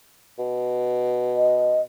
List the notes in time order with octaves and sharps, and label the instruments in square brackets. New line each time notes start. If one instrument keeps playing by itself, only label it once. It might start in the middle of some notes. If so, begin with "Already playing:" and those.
[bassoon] B2
[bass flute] D#5